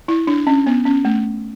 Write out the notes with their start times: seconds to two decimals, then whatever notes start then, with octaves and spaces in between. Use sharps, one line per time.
0.08 E4
0.27 D4
0.47 C#4
0.66 B3
0.85 C#4
1.05 A3